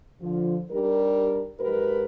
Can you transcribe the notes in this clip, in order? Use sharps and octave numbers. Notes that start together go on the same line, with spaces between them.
D3 F3 F4
G3 D4 D#4 G4 A#4
G#2 F#3 D#4 G4 A#4 B4